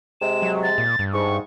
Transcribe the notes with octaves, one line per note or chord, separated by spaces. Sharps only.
C3 G#3 E7
F#3
A6
A#2
G2
G#2 C#6